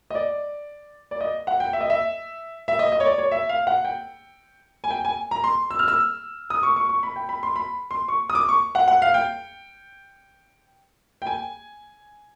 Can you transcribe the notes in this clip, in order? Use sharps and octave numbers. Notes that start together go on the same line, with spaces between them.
D#5
D5
D5
D#5
F#5
G5
E5
D#5
E5
E5
D#5
D#5
C#5
D5
C#5
E5
F5
F#5
G5
G#5
G5
G#5
A#5
C6
E6
F6
E6
D#6
C#6
C#6
C#6
B5
G5
B5
C6
B5
C6
C#6
D#6
D6
C#6
F#5
F#5
F5
G5
G5
G#5